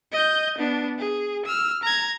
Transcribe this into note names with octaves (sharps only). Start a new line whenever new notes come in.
D#5 G6
B3 D4
G#4
E6 F6
A#5 G#6